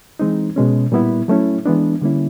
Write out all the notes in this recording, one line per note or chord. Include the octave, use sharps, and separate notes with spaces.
E3 G#3 C4 D#4
B2 G#3 C#4
A#2 G3 B3 E4
F#3 A3 C#4 E4
E3 G#3 B3 D4
D3 G3 A#3 C#4 E4